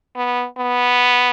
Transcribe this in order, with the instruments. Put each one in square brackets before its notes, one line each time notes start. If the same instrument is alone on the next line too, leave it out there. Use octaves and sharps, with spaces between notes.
[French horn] B3
B3